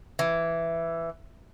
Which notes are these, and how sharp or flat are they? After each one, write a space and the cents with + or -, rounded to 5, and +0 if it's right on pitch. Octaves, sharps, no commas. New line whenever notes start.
E3 +10